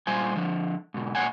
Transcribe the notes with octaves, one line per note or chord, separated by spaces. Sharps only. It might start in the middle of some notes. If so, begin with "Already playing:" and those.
A#2 G3 F4 C5 G#5
D3 F3
G#2 B2
A#2 C#5 F#5 G#5